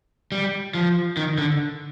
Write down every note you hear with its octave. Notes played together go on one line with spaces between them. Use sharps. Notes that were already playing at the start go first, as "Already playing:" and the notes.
G3
F3
D#3
D3